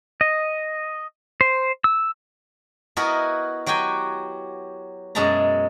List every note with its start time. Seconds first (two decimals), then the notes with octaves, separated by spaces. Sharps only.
0.21 D#5
1.41 C5
1.84 E6
2.97 B3 E4 F#4 A#4 B4 D#5
3.66 F#3 F#4 G4 G5 G#5
5.15 F#2 B2 G#3 E5 A5 A#5